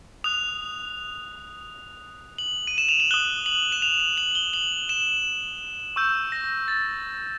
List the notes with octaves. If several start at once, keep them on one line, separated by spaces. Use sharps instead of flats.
D#6 F#6 F7
F#7
D#7
E7
F7
F#7
D#6 F#6 G7
F#7
E7
F7
F7
F#7
G7
F#7
E7
C#6 E6 G6
A#6
A6